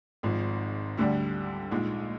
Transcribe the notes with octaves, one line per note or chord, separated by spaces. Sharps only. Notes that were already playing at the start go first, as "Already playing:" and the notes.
G#1 G#2 F3
D2 D3 G3 D4
A#1 A#2 G#3 D#4